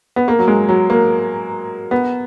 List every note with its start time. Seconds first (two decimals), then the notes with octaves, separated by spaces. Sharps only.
0.16 B3
0.28 A#3
0.39 F#3
0.48 G#3
0.69 F#3
0.90 A#3
1.91 B3